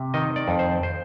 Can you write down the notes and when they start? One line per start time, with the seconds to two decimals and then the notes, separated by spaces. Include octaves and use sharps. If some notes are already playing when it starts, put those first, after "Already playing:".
Already playing: C3
0.14 D#3 D#5
0.36 D5
0.48 F2
0.59 C5
0.83 C5